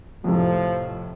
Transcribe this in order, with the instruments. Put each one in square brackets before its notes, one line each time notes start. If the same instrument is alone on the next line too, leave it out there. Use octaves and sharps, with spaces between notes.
[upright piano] F2 A2 C3 [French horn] F3